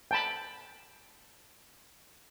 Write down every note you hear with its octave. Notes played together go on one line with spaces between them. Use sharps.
G5 A5 B5